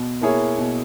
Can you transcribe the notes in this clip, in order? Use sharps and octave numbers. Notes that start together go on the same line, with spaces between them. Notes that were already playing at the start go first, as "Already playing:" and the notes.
Already playing: B2
A#3 E4 G#4 C#5
B2